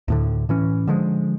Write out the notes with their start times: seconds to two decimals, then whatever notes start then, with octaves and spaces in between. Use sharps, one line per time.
0.08 D2 A2 D3
0.49 A2 E3 C#4
0.87 D3 F3 G#3